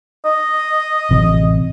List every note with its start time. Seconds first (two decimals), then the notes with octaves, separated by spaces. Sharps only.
0.25 D#5
1.11 A1 C3